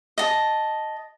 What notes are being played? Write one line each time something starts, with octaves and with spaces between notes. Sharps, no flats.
D#5 A5